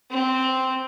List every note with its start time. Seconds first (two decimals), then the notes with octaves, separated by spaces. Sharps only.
0.10 C4